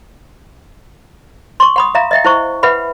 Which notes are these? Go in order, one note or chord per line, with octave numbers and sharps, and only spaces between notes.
C6 C#6
F#5 B5 D#6
E5 F5 A#5
D#5 E5 G5
E4 C5 C#6
B4 E5 F#5 B5